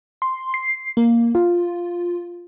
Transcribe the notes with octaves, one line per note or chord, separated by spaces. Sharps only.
C6
C7
A#3
F4